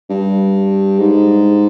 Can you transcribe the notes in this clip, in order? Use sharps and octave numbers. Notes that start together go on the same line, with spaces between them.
G2
G#2